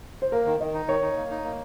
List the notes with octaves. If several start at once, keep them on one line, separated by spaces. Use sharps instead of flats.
C5
A#3 A#4
D#3
D#3 D#5
D#4
D#3 C#5
D#4
A#3
D#4
A#3